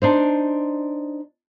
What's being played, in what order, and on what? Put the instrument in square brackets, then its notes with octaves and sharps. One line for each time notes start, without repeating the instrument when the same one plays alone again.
[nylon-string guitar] D4 D#4 C5